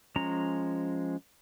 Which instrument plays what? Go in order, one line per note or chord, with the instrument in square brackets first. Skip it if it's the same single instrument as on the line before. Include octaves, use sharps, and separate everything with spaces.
[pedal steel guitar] F3 G#3 C#4 A#5